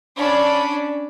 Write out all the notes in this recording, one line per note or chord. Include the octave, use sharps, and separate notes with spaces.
C#4 D4 B5